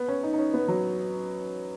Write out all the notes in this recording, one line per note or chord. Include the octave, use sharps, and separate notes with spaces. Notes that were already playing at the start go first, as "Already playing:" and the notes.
Already playing: B3
C#4
D#4
D#4
C#4
B3
F#3